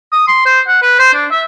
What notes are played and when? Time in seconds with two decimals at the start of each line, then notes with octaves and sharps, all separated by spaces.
0.13 D#6
0.27 C6
0.46 C5
0.67 F#5
0.82 B4
0.99 C5
1.14 D4
1.31 E5